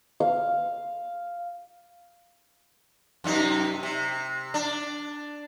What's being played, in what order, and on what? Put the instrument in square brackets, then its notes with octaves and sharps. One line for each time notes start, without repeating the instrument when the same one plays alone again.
[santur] F5
[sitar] F#2 C3 D#4
C3
D4